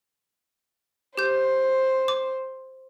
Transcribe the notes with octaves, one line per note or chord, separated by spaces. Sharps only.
G4 C5 G6
D6